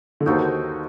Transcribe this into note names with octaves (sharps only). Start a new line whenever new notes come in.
D3
D#2 D#3 D#4 F#4 A4 C5